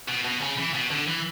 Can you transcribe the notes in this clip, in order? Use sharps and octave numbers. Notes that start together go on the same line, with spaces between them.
B2
B2
C#3
E3
B2
D3
E3